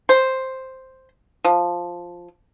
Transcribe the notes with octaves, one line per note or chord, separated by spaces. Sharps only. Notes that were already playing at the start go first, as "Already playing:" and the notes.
C5
F3